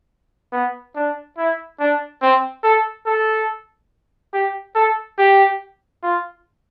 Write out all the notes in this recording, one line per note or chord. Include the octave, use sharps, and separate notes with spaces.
B3
D4
E4
D4
C4
A4
A4
G4
A4
G4
F4